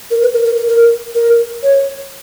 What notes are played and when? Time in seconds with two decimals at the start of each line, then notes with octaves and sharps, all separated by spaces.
0.11 A#4
0.22 B4
0.33 A#4
0.45 A#4
0.57 A#4
0.68 A#4
1.15 A#4
1.63 C#5